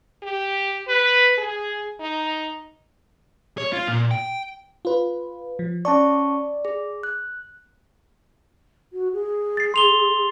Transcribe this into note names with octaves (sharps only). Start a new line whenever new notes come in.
G4
B4
G#4
D#4
C#5
F4
A#2
G5
F4 B4
F3
C#4 D5 A5 C#6
G#4
F#6
F#4
G#4
A6 C7
C6 F7 G7